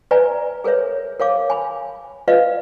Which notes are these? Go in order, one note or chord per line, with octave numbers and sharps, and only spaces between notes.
B4 D5 E5 G#5 A#5
G#4 A#4 B4 C#5 E5
A#4 C#5 F5 D6
G#5 B5
F4 B4 D5 D#5 F5